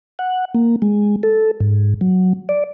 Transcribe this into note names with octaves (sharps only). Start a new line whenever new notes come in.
F#5
A#3
G#3
A4
G#2
F#3
D5